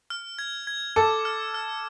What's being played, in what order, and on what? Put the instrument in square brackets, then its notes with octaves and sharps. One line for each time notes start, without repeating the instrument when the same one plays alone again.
[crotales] F6
G#6
G#6
[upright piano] A4 [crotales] D6
[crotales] F6
F6